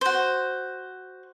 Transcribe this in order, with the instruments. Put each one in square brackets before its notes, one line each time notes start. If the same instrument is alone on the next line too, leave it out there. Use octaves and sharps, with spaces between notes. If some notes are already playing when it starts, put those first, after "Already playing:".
[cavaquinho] F#4 C5